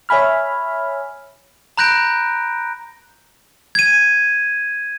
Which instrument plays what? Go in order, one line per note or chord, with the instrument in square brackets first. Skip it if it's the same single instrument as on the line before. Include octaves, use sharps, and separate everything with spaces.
[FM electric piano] C#5 E5 G#5 B5 F6
[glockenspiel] A#5 B5 F#6 G6 A#6 D7
G#6 D#7